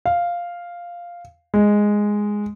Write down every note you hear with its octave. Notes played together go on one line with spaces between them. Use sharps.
F5
G#3